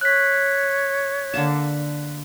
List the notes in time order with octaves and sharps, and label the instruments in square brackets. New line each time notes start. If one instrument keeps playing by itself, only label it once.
[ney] C#5 [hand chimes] F#6 B6
[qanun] D3 A#3 A5